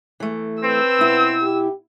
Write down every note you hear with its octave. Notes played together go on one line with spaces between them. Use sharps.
E3 A3
C4 B4 E6
B2 E4
G4